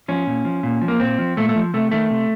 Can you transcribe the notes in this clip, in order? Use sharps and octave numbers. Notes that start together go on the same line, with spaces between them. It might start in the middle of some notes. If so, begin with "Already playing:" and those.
F3 C#4
A#2
F3
A#2
F3
A#3
A#2 C4
F3
A#2 A3
A3
F3
C3 A3
D#3 A3
C3